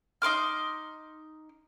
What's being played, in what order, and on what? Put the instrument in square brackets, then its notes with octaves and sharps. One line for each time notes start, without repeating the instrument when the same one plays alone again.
[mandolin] D#4 C6 D6 F6